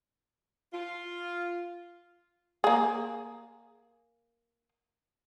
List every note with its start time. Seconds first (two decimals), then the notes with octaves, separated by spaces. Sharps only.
0.72 F4
2.64 A#3 G#4